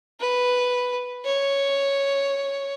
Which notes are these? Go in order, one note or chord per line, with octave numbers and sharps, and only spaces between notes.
B4
C#5